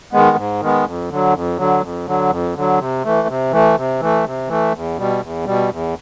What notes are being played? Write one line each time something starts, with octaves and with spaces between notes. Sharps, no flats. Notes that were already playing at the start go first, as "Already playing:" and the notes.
D#3 G#3 B3
G#2
D#3 G#3 B3
F2
D3 F#3
F2
D3 F#3
F2
D3 F#3
F2
D3 F#3
C3
E3 A3
C3
E3 A3
C3
E3 A3
C3
E3 A3
E2
B2 G3
E2
B2 G3
E2